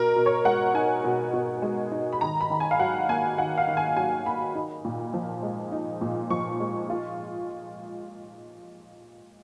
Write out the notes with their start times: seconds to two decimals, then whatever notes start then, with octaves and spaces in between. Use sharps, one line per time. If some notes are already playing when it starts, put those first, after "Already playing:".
Already playing: B2 A#4
0.16 B2
0.26 C#5
0.45 G#3 F#5
0.74 D#4 G#5
1.04 B2
1.34 B2
1.62 G#3
1.92 D#4
2.13 B5
2.21 D#3 A#5
2.41 B5
2.50 D#3
2.60 G#5
2.71 F5
2.80 F#3 F#5
3.09 A#3 G#5
3.38 D#3 F#5
3.58 F5
3.67 D#3
3.77 G#5
3.96 F#3 G#5
4.26 A#3 B5
4.55 D#4
4.85 A#2
5.14 F3
5.43 G#3
5.72 D#4
6.01 A#2
6.30 F3 C#6
6.60 G#3
6.90 F4